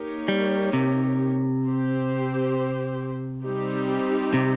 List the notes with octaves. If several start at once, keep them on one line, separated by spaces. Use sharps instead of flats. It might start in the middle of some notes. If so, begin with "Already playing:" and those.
Already playing: A#3 D#4 G4 A#4 C#5
G3
C3
C4 G4 C5
G3 C4 D#4 G4
C3